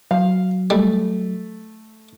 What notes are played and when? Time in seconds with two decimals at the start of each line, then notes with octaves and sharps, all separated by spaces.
0.11 F#3 F5
0.70 G3 A3